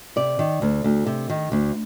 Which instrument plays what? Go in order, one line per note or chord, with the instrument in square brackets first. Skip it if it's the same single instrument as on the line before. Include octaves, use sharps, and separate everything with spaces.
[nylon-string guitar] C3 D5
D#3
D2
D2
C3
D#3
D2